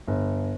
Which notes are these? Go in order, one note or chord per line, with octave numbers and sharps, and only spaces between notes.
G1